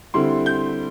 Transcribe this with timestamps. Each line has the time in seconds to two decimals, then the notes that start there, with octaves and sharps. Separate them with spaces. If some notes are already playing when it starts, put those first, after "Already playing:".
0.14 D3 G3 C4 E4 C6
0.46 G6